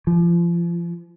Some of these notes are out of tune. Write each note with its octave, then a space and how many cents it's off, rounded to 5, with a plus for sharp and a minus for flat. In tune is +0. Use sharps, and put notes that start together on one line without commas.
F3 -30